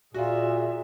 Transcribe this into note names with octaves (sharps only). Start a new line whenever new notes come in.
A#2 F4 F#4 G#4 E5